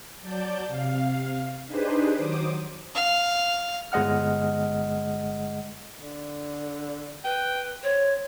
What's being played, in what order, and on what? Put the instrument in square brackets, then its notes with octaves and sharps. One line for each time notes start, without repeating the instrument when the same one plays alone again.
[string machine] F#3 D5 A5 G6
C3 F5
D4 D#4 G4 G#4 B4 C5
D#3 F#3 C5 D6 D#6
[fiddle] F5
[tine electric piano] G1 G#3 D#5 F#5 F6
[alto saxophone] D3
[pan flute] B4 [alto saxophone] G5
[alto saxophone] C5 [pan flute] C#5